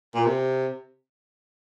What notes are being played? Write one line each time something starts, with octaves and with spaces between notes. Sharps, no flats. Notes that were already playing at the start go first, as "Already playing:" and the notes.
A#2
C3